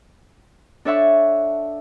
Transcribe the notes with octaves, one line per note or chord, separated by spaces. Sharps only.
D4 A4 C#5 E5 F#5 C#6